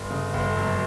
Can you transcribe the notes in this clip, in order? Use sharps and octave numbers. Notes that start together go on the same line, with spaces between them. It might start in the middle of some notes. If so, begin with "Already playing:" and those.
Already playing: G1
C#3
G1
F#2